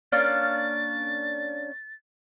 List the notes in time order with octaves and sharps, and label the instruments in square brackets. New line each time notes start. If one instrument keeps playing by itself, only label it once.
[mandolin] A#3 C#4 D4 [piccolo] A6